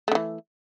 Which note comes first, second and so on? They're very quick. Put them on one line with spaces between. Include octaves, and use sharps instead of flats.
A3 D3 E3